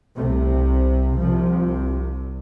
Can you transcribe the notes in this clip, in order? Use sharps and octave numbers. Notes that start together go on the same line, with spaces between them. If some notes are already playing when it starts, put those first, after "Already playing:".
C2 C3 A3
C2 C3 F3